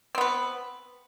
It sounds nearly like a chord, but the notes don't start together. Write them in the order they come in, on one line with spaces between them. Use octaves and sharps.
C4 B3 B4